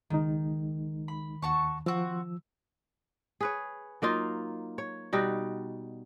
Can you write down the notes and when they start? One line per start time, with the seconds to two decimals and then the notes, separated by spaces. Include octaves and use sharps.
0.10 C#2 D#3 G#3 D#4
1.08 B5
1.42 D#2 F#4 A5 C#6
1.86 F3 C4 F#4 E6
3.41 G#4 B4 C#5
4.02 F#3 A#3 D#4 F4
4.78 C#5
5.13 B2 G3 D#4 F#4